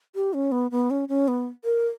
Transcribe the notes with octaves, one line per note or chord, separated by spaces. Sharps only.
G4
C#4
B3
B3
C#4
C#4
B3
A#4